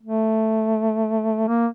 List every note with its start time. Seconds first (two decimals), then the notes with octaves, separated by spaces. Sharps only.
0.03 A3
1.48 A#3